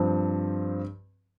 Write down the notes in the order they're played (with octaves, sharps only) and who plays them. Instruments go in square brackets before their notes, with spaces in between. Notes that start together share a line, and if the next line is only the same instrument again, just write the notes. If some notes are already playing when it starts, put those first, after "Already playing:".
Already playing: [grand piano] G2 F3 C4